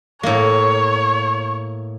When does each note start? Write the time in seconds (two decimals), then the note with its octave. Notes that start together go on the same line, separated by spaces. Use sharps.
0.23 A2 A#3 C#5